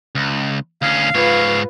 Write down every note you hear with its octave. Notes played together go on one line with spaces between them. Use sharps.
C#2
D2 C#4 F5
G#2 F4 B4 C#5